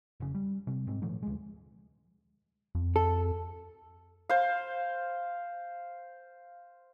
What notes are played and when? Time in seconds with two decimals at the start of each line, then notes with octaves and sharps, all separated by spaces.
0.20 F1 C#3
0.35 G3
0.67 C3 G3
0.87 G#2 G#3 C4
1.02 A#2 D#3 F3 A3
1.23 D2 G#3
2.75 F2
2.96 A4
4.29 C5 F5